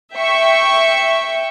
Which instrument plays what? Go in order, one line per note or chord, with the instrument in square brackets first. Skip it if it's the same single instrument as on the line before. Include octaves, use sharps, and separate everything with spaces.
[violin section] E5 G5 C#6